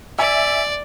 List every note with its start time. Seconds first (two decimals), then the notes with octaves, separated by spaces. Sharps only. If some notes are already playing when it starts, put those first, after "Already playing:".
0.19 D5 E5 G#5